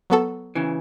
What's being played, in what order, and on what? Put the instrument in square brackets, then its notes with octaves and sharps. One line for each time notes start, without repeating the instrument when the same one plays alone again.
[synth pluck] F#3 B3 F#4 A4
[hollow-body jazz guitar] C#3 E3